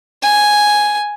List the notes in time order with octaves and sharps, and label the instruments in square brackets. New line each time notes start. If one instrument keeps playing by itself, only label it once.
[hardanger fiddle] G#5